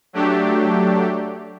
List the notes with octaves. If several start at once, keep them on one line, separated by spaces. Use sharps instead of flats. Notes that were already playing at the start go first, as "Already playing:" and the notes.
F#3 A3 D4 G4